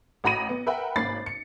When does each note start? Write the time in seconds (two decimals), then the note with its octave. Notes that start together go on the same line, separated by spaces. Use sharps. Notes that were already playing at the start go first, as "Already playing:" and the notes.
0.24 A1 F#4 A#5 B5 A#6 D#7
0.49 B3
0.66 A#4 B4 E5 F#5 G5 B5
0.96 G#1 A#3 C#4 B5 A6 C7
1.26 C#7